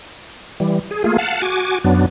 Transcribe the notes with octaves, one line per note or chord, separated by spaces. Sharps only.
E3 G3
G#4
A3 A#3 F4 G#4
F5 F#5 A5
F#4 G#5 D6
F#2 F#3 B3 D4